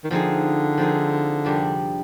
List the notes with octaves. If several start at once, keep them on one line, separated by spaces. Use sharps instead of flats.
D#3
D3 F3 C4 D#4 G#4
F3 C4 D#4 G#4
F2 C3 G3 D4